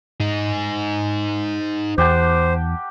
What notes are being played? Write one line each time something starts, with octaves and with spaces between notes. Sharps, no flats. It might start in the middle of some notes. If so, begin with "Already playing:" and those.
D#4 G#4
E2 G4 C5 F#5 A5